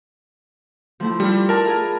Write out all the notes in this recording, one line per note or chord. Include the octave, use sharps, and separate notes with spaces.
F3 A3 E4
G3 D4 E4 F4
A#4 A5 B5
G#4 F5